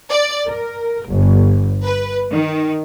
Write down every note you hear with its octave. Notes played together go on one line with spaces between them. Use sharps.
D5
A#4
G1
B4
D#3